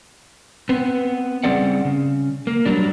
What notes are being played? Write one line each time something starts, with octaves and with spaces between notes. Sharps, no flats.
B3 C4
C#3 G3 C4 G#4 D5 F#5
C#3
A#3
F#3 G3 D4